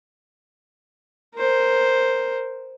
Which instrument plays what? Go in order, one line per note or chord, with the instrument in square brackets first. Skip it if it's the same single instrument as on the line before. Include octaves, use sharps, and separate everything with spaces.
[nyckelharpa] A#4 C5